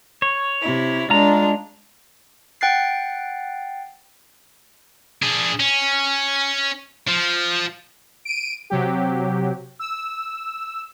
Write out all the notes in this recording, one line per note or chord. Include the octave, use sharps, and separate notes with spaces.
C#5
C3 E4
G#3 D4 F4 A#5
F#5 G5 F#6 A6 C7
D4 G#4
C#4
F3
D7 D#7
C3 F#3 G4
E6